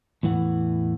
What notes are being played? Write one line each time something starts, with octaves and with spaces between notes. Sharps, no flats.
E2 A2 E3 F#5